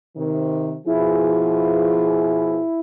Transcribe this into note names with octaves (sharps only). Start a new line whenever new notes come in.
C3 D#3
B2 F3 E4 G#4